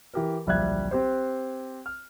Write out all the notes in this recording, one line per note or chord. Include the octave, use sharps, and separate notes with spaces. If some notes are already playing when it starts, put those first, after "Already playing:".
E3 G4 A#4
D1 A#1 G3 E5 F#6 G#6
C4 G4 C5
F6